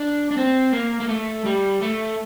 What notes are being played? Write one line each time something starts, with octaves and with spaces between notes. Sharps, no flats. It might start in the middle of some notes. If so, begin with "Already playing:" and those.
Already playing: D4
D4
C4
A#3
A#3
A3
G3
A3